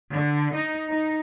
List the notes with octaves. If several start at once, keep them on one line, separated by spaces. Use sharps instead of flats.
D3
D#4
D#4